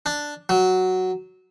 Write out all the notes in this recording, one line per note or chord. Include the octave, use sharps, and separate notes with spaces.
D4
F#3